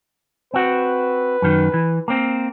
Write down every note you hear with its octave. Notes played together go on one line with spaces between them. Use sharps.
C4 F#4 B4
F#2 D#3
E3
A#3 C4